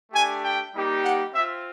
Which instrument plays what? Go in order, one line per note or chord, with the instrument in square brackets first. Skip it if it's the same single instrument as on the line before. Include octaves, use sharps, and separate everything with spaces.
[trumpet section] A3 D4 G4 G#5
G5
G3 A#3 D#4 G4
F#5
C4 F4 E5